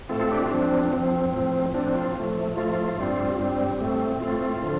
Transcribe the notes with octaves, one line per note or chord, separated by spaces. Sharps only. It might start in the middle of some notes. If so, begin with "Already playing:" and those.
A2 A3 C4 F4 A4
F4 A4
D4 G4
F4
F2 F3 C4 D4
F2 F3 C4
A2 F3 C4
A2 F3 C4 D4
F4
A2 F3 A3
A2 F3 A3 F4
G2 G3 C4
G2 G3 C4
A2 A3 C4
A2 A3 C4 F4
D3 F3